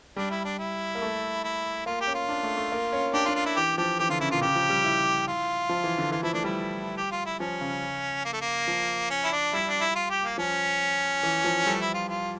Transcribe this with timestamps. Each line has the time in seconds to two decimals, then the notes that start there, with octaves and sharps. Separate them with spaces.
0.17 G3 D4
0.31 E4
0.45 D4
0.59 E4
0.95 A#3
1.02 A3
1.44 E4
1.86 A#3 F4
2.01 G4
2.07 C#4
2.15 F4
2.29 D4
2.43 A3
2.57 A3
2.72 A#3
2.93 C#4
3.14 D4 G4
3.25 F4
3.29 D4
3.35 F4
3.46 E4
3.56 E3 G4
3.78 F3 G4
3.99 E3 G4
4.09 D3 F4
4.21 C#3 E4
4.31 A#2 F4
4.41 C#3 G4
4.55 F3
4.70 G3
4.84 E4
5.27 F4
5.69 F3
5.84 E3
5.98 D3
6.12 E3 F4
6.23 F3 E4
6.33 A3 D4
6.44 G3 E4
6.97 G4
7.11 F4
7.26 E4
7.40 F3 C#4
7.61 C#3
8.25 A#3
8.33 A3
8.41 A#3
8.68 F3
9.11 C#4
9.24 E4
9.32 D4
9.53 G3 E4
9.68 D4
9.81 E4
9.95 F4
10.10 G4
10.24 A#3
10.38 F3 C#4
11.23 E3
11.44 F3
11.65 G3 A3
11.80 E4
11.94 F4
12.09 F4